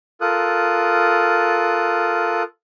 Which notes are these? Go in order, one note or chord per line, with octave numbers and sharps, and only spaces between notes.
F4 A4 A#4 D#6 F#6